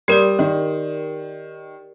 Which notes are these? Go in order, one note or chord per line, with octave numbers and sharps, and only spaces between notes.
G3 G4 A#4 D5
D#3